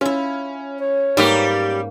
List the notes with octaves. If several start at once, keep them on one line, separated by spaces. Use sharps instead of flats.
C#4 E4 F4
C#5
G#2 G3 A#3 G4 B4